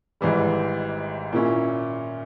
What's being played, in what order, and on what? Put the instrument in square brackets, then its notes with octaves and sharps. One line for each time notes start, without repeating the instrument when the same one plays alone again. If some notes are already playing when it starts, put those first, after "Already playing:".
[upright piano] G#1 G#2 E3 G3
A#2 A#3 C#4 E4